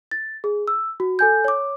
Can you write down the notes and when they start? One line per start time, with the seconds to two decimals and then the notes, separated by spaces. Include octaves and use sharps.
0.11 A6
0.44 G#4
0.68 E6
1.00 F#4
1.19 A4 G#5 G6
1.45 C#5 D6